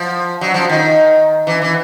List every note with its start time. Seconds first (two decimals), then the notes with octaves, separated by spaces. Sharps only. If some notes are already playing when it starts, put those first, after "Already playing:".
Already playing: F3
0.41 F#3
0.54 F3
0.69 D#3
1.47 E3
1.62 E3